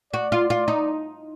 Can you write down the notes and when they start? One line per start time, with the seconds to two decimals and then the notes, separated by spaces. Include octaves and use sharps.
0.13 F#4 D5
0.32 F4
0.50 F4
0.68 D#4